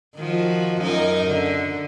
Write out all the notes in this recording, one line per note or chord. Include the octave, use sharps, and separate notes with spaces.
D#3 F3 F#4
F#2 D#4 A#4
D3